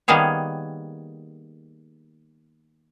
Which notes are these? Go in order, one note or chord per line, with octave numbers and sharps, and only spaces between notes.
D#3 G3 A#3 B3 G#4 C#5